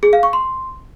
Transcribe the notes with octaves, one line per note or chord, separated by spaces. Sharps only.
G#4
F5
C#6
C6